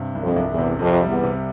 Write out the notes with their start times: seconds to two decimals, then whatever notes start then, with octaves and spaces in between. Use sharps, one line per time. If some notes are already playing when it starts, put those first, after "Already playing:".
Already playing: G2 C3
0.15 C2
0.22 F2
0.36 C2
0.51 E2
0.58 C3
0.79 F2 C3
1.02 G3
1.09 E2
1.23 C3